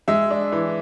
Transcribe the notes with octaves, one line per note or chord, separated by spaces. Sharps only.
G#3 E5
D4
E3